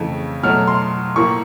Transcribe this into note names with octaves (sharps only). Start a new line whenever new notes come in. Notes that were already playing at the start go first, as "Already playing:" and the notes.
Already playing: F2 C#3 E3 A3
B2 F#3 A3 F6
C6
A2 F3 A#3 C#6